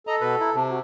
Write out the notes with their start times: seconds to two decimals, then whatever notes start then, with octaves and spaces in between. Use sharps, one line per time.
0.07 A4 D#5 A#5
0.21 B2 F#4 B4
0.40 E4 A#5
0.55 C3 A5
0.69 F#4